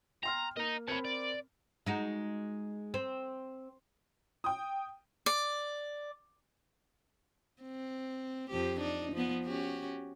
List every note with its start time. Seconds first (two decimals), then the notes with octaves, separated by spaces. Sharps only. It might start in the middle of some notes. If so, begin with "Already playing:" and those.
0.23 G5 A#5 C6 F6
0.57 A#3 D#5 A#5
0.88 C4 A#4 C#5 A5 B5
1.05 D5
1.86 G#3 D#4 F#4
2.94 C4
4.44 G5 D#6
5.26 D5
7.62 C4
8.50 F2 F3 G4
8.80 D4 D#4
9.13 F3 B3
9.45 C#4 F#4 G4